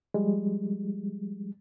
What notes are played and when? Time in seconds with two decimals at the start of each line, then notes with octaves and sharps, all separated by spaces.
0.14 F3 G3 G#3